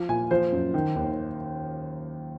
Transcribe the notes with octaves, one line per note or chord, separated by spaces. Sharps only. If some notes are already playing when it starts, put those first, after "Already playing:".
Already playing: F3
A#2 G#5
F3 C5
F#2
D#3
D#2